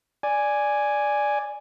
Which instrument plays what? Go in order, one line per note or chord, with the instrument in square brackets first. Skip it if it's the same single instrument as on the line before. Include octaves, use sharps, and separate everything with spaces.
[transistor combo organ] D5 G#5